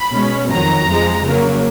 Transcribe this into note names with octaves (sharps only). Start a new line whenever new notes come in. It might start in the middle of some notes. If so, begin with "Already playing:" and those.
Already playing: B5
B2 G#3 C#4
F2 D#3 F#3 A#5
F2 F3 G#3
C#3 F#3 A#3